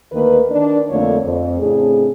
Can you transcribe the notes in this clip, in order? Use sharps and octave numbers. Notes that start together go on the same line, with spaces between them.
D2 D#3 A#3 B4
D#3 D4
F2 D3 A3 A#3 D4 C#5
F2
A2 C#3 C4 D4 G#4